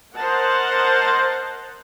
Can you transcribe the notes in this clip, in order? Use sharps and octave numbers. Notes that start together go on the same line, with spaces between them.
A#4 C5 D#5 F#5 A5